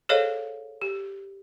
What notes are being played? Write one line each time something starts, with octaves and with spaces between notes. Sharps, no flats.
G#4 A4 C5 C#5 D#5 F5
G4